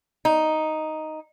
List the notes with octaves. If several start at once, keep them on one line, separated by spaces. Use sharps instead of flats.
D#4